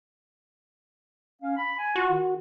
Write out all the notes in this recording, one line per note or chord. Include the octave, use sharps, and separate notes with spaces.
C#4 F5
B5
G#5
F4 F#4
D#3